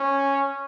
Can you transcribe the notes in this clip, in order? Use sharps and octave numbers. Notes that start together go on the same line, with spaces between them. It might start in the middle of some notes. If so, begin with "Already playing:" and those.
Already playing: C#4